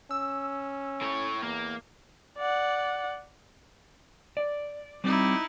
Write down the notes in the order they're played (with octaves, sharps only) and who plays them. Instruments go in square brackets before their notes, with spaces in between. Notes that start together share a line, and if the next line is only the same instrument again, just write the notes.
[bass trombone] C#4 [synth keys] E6
[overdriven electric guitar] A2 C#5
[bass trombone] E2 [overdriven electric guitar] A#3
[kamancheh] D5 F#5
[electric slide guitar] D5
[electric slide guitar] G3 C4 [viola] D#4 E4